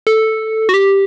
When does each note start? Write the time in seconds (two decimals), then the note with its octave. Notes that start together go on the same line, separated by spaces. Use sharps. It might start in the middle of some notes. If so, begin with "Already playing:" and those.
0.07 A4
0.69 F#4
0.74 G4